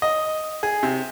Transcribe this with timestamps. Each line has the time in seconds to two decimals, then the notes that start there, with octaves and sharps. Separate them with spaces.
0.02 D#5
0.63 G#4
0.83 C3